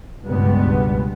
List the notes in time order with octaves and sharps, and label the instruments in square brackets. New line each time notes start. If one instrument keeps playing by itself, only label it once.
[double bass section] C#2 G2 B2 G3 G#3 B3